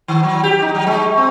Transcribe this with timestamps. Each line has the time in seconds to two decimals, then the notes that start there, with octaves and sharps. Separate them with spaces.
0.08 D#3
0.23 F#3
0.43 G4
0.62 D#4
0.75 F#3
0.87 G#3
1.17 C4